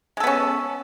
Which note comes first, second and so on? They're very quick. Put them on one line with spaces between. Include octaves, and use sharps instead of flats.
G#3 A4 B3 C#4